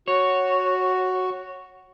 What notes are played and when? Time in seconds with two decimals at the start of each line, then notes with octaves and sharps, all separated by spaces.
0.08 F#4 C#5